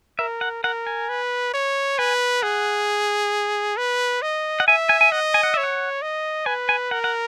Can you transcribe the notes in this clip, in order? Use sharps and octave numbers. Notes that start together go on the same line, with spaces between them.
A#4 E5
F#5
A#4 F#5
G#5
B4
C#5
B4 G#5
G#4 F#5
B4
D#5
F#5
E5 G#5
G#5
G#5
D#5 F#5
G#5
F#5
C#5 E5
F#5
D#5
B4 G#5
G#5
A#4 F#5
F#5